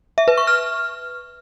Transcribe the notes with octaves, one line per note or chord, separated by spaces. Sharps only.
E5
B4
C#6
F6